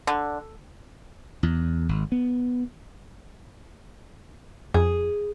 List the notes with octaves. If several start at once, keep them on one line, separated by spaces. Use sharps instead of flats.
D3
E2
G#1
B3
F2 G#4